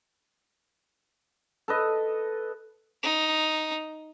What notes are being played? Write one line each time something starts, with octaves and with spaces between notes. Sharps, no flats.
A4 B4 D#5
D#4